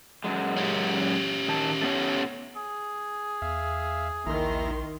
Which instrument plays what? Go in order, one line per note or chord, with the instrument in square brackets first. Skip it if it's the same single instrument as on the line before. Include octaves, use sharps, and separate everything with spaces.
[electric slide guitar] F#2 F#3 G#3
[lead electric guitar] C#4 G4
[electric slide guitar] D#3 A5
A3 B3 C#5
[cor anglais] G#4
[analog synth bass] E2 [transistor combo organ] E5 F5
[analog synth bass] A#1 [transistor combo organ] D#2 E4 A#5 [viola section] D#3 C6